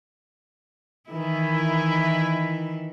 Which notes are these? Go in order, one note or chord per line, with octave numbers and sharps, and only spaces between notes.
D#3 E3 E4